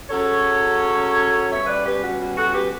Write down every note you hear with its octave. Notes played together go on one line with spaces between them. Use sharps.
C#3 F#3 C#4 A4 C#5
B2 G3 C#4 C#5 E5
B4 D5
G4 B4
F#4
F#4
F#4 A4
G4 B4